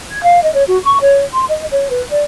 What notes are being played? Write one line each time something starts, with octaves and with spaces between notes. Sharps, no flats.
G#6
F5
D#5
C#5
F#4
C#6
C#5
C6
D#5
C#5
B4
D5